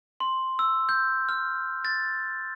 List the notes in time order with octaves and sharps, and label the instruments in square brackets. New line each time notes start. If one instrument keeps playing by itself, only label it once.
[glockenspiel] C6
E6
G6
F6
A6